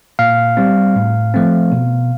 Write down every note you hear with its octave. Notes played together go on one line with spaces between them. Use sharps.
A#2 F5
G3 C4
A2
F3 A3 C4
B2